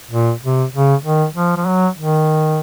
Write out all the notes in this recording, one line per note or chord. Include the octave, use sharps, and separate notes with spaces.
A#2
C3
C#3
D#3
F3
F3
F#3
D#3